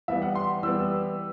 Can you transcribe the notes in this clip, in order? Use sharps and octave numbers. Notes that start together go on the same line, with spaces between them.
E3 G3 B3 E5
F#5
C6
E3 G3 B3 E6